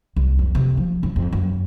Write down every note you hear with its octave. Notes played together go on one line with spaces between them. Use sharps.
C2
F2
C3
F3
F2
F2
F#2